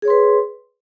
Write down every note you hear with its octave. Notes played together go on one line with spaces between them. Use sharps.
G#4 B4 C#5 C6